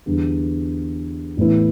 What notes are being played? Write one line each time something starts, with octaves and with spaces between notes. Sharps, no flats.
E2 D3 G3
A1 A2 E3 B3 E4